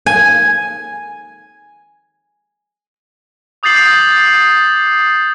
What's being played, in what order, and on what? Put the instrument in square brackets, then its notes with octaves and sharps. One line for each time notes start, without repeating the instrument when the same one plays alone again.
[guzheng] G#5
[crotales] D6 D#6 G6 A6 C7 F#7